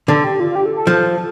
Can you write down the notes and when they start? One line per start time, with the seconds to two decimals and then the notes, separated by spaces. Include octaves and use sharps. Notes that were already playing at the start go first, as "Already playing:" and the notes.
0.08 D3 A4
0.24 G4
0.40 F4
0.51 F4
0.55 G4
0.66 A4
0.76 A4
0.87 F3